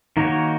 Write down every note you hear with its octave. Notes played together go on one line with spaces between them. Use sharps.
D#3 A#3 D#4 F#4 C#5